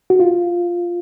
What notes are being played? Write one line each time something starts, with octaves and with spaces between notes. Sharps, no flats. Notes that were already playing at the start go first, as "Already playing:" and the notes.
F#4
F4